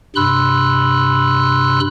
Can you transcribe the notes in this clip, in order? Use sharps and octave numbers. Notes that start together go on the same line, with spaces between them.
G2 C3 B5 C6 E6 F#6